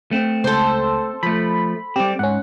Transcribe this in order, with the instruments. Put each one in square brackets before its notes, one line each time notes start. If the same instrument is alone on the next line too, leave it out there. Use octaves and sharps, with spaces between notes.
[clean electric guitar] A3 C4
[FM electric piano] C#2 [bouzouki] A4 C5
[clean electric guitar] F3 A3 [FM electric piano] B5
[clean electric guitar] G3 C4 [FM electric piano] G4 D6
[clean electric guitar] G#2 [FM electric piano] C#4 F#5